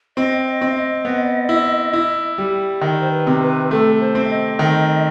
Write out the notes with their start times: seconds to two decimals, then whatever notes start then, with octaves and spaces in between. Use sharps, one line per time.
0.17 C4 D#5
0.46 D#5
0.61 C4
0.70 E5
0.75 D#5
1.05 B3
1.49 E4
1.93 E4
2.38 G3
2.81 D#3
3.01 C5
3.11 B4
3.27 C3
3.42 B4
3.71 A3 A4
4.00 C5
4.15 C4
4.24 E5
4.29 D#5
4.59 D#3